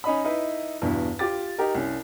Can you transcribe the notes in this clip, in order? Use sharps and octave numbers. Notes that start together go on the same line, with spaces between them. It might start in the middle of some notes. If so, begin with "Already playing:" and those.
C#4 D#4 D#5 B5
D#4 E4 B4
E2 G2 B2
F4 G4 D6 A6
D#4 G4 A#4
C2 C#4